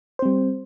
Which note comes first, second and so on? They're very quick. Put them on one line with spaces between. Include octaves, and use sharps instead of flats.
C5 C4 G3